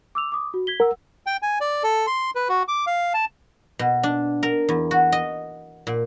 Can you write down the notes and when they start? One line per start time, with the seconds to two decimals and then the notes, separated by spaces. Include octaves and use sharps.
0.15 D6 E6 F7
0.32 D6 D#6
0.54 F#4
0.67 G#6 B6 G7
0.80 A#4 F#5 E6
1.26 G5
1.42 G#5
1.61 D5
1.83 A4
2.07 C6
2.35 B4
2.49 F#4
2.68 D6
2.87 F5
3.14 A5
3.79 B2
4.03 D4
4.43 A#4
4.69 E2
4.91 F#4
5.12 D#5
5.87 A#2